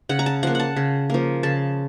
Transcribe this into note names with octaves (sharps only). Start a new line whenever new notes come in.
C#3 F#5
A#5
A5
F3 A#3 F#5
F#5 A5
C#3
F3 A#3
C#3 A5